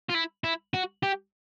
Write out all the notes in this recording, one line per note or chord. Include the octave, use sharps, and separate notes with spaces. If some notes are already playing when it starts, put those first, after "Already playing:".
F4
E4
E4
F#4
G4